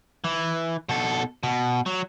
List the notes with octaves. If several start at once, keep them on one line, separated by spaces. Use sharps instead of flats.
E3
B2 A4
B2
F#3